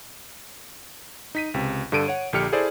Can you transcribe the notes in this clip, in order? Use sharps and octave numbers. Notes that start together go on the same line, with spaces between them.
D#4 B6 D#7
C#2 C3
G2 D3 A4 D7 D#7
C#5 F#5
A#1 D3 G4 F6 C#7
E4 G#4 A4 C5 D5